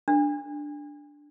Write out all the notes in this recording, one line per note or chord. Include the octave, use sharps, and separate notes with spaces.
D4